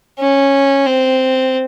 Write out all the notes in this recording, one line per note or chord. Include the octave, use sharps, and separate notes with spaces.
C#4
C4